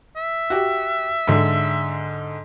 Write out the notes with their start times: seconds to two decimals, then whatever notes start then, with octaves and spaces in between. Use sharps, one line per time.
0.16 E5
0.50 F#4 G4
1.27 G#2 D3